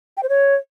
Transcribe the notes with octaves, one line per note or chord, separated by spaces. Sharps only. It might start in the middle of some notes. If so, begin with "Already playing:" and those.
G5
C5
C#5